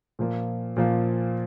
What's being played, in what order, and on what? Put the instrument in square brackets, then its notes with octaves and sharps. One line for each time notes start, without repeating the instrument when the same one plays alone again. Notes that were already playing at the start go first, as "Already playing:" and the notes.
[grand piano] A#2 F3 A#3
A#2 F3 A#3